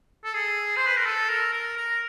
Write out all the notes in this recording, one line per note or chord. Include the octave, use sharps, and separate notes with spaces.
A4
G#4
C5
B4
A#4
A4
A#4
A#4
A#4